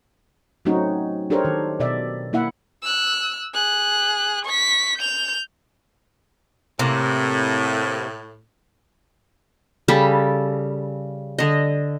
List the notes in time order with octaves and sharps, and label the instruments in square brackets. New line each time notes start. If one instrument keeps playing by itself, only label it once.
[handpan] F#3 A3 C4 C#4 D#4 F#4
D4 G4 A4 A#4 C5 C#5
D#3
B2 D5 E5
A#3 E4 E5 F#5
[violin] E6 F#6
G#4 F#6
C#6 B6
G6 F7
[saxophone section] A2 [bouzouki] C3 A#3
[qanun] C#3 G3 A4 B5
D3 D#5